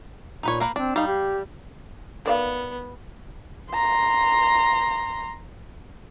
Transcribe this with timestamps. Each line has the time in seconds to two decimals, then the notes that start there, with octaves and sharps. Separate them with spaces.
0.43 A#2 D#4 B4 C#5
0.60 A#3 A#4 B4
0.76 C4 D4
0.96 G3 D#4 F5
1.07 G4
2.26 D#3 B3 D5 F5
3.74 A#5 C6